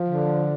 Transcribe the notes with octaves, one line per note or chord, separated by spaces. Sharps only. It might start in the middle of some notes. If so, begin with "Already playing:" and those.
Already playing: F3
D3